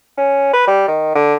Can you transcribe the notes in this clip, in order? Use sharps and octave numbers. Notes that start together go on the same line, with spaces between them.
C#4
B4
G3
D#3
D3